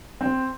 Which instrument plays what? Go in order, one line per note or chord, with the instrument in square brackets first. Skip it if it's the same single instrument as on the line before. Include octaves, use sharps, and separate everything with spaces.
[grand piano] C4